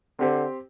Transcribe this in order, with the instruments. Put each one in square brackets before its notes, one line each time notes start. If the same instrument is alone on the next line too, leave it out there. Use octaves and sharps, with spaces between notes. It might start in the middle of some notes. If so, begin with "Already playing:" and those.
[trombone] D3 [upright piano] C4 G4 C5